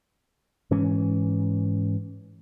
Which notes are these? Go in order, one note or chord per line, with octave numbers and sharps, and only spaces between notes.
G#2 E3 C#4